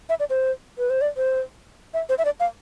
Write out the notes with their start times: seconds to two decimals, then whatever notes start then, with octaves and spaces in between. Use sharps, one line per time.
0.09 E5
0.20 D5
0.30 C5
0.78 B4
0.90 C5
1.01 D5
1.17 C5
1.94 E5
2.09 C5
2.19 E5
2.25 D5
2.40 F5